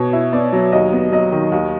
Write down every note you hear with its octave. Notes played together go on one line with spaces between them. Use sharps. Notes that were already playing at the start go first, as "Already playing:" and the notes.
Already playing: B2 C#5
E4
B3 D5
F#3
D#2 D#5
B3
F#3 D#5
D#3
D#2